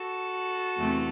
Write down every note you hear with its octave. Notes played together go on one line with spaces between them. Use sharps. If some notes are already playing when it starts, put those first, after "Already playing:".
Already playing: F#4 A4
E2 C3 E3 A3